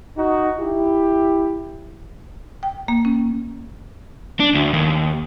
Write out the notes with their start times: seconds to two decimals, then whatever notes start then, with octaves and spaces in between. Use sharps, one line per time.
0.18 D#4 F#4
0.59 E4 G4
2.63 G5
2.88 A#3
3.05 C#4
4.40 D4
4.55 D2
4.73 D#2